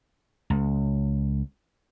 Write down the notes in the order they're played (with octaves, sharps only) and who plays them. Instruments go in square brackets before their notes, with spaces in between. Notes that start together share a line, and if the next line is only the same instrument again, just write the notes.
[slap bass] C#2